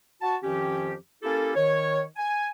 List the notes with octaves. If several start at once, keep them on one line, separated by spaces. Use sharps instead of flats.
F#4 A5
F2 D#3 F3 C#4 G4
A#3 C#4 E4 G4 A4
D#3 C#5
G#5